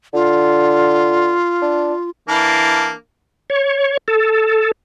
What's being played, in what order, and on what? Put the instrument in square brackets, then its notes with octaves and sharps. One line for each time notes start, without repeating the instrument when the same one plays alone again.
[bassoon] D3 [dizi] F4
[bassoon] D4
[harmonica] E3 A#3 D4
[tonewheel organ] C#5
A4